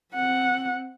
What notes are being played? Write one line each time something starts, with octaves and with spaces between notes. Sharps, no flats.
C4 F#5